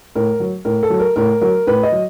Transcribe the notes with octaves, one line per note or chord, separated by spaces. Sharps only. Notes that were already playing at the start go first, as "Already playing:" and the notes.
A2 A#4
F#3
A2 A#4
A4
F#3
A#4
A2 A#4
F#3 A#4
A2 B4
D#5
F#3